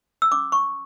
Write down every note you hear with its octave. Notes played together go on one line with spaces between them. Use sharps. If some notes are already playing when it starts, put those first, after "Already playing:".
E6
C#4 D6
C#6